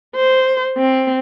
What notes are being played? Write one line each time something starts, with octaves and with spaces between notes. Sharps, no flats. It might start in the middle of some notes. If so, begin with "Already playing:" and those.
C5
C4